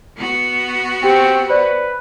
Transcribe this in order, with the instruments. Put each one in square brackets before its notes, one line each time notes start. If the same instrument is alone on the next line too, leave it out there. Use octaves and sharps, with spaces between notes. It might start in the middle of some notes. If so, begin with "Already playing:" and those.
[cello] B3 F#4
[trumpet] C4 [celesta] G4 G5
[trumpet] B4 [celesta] C5 D5